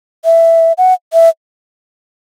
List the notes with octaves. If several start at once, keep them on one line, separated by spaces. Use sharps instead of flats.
E5
F#5
E5